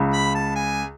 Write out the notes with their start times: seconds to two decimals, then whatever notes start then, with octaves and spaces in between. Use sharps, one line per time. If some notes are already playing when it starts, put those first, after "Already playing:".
Already playing: C#2 C#3
0.13 B5
0.34 A5
0.55 G#5